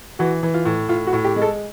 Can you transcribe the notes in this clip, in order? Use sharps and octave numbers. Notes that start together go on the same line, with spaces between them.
E3 F#4
E3
F4
A2
A2 F4
F#4
A2
G4
G#3
A4